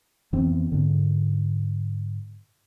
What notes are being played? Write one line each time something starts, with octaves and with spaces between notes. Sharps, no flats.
F2 E3 B3 C4
G#2 D3